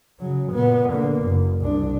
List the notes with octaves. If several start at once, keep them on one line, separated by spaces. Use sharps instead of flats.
C#3 F#3
A#2 B3
D3 A#3
F#1
C2 D4